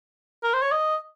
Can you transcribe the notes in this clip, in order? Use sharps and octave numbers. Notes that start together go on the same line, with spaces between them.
A#4
C5
C#5
D#5